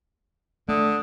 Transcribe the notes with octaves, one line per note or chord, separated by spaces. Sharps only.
D3 A3 D#6